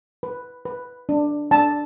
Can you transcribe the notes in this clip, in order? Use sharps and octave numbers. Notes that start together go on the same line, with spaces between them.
B4
B4
D4
D4 A5